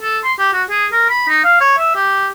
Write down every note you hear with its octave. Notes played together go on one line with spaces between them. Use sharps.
A4
C6
G4
F#4
G#4
A#4
B5
D#4
F5
C#5
E5
G4